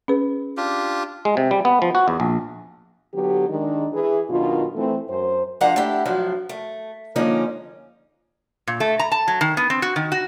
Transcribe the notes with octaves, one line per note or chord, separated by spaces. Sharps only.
C#4 G#4 B4
D4 F4 G4
G#3
C3
G3
B3
F3
F#4
E2
A#1
D3 F#3 B3 G4
D#3 G#3 D4
E3 G#4
F#2 B2 D#3 D4 F4
E3 A3 C4
F#2 C5
F3 G#3 D4 F5 F#5 A#5
A3 D4 E4 G4
G2 F3 F#3 D4
A3
D3 F3 G#3 A#3 C#4 D#4
A#2
A3
A#5
A5
F#3
D#3
B3
C4
F#4
D#3
F#4